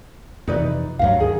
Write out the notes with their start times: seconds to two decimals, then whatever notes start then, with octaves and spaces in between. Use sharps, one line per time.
0.48 F2 C3 E3 D#4 B4 D5
0.99 D2 G2 F#3 F5
1.20 D#3 G#4